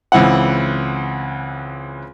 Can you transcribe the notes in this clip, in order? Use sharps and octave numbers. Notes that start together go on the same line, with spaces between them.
C#2 E3 C4 F#5